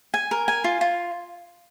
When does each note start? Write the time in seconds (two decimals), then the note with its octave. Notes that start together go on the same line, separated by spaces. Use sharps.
0.14 G#5
0.31 A#4
0.48 G#5
0.64 F4
0.81 F4